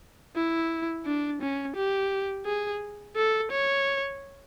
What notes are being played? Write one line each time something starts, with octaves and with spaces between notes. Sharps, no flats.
E4
D4
C#4
G4
G#4
A4
C#5